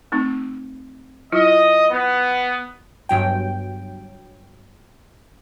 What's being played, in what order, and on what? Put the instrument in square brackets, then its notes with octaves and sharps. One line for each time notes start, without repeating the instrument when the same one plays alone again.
[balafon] A3 C4 D#4
[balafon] F#3 E4 F4 [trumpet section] D#5
[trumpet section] B3
[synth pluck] G1 G2 F#3 G5